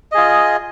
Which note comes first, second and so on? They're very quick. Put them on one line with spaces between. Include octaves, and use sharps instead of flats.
D#5 G#4 F4